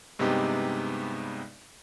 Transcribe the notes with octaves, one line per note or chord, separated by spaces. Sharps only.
G2 C3 G#3 B3 D#4 G4